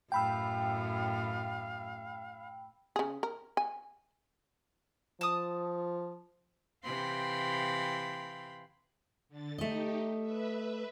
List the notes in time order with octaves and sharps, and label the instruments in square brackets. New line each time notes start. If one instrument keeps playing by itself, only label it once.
[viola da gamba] F#2 A2 [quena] F5 [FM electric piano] G5 B5 E6
[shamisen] C#3 G#4
A#4
G#5
[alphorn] F3 [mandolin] A5 D#6
[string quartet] C3 E3 F5 G5 B5 C6
[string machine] D3 A6
[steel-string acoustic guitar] A3 D#5 [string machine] D#4 G4
[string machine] B4 E5